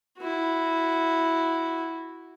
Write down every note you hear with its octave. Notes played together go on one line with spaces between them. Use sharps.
E4 F#4